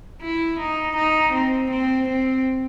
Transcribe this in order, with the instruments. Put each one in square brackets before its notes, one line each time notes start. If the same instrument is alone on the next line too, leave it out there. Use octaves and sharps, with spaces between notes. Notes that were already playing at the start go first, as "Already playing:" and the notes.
[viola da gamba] E4
D#4
D#4
C4
C4
C4